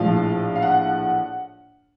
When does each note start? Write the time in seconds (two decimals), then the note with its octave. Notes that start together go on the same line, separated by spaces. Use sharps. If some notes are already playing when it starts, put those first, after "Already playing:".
Already playing: A#1 A2 F3 F5
0.56 F5
0.62 F#5